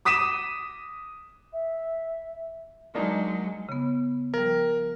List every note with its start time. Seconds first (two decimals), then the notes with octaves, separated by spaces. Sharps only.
0.05 D6 D#6 B6 D#7 E7
1.53 E5
2.95 F#3 G#3 A#3 D4 D#4
3.69 C#3 B3
4.34 F3 G3 A#4